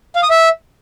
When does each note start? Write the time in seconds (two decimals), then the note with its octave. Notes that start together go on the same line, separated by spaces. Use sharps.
0.16 F5
0.23 D#6
0.30 E5